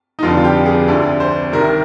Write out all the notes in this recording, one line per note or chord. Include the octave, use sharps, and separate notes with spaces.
D#4
F1 F2 D3 F4
F4
G4
G#4
D2 D3
C5
C2 C3 D#3 A#4